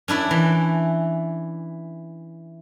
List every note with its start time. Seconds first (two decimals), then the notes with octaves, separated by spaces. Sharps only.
0.08 C#4 D4 E4 D5
0.31 E3